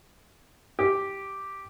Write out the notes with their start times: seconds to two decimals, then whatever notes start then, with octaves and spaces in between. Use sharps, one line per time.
0.79 G4